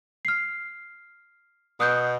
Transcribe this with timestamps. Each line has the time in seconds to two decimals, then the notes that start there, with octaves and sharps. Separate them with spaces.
0.25 F6 C7
1.80 B2 D#6 F#6 G6